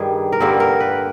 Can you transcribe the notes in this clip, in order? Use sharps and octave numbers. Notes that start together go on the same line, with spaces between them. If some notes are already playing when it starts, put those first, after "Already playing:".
Already playing: G2 D#3 G3 G#4
A#4
G2 D3 G3 A#3 A4
A#4
B4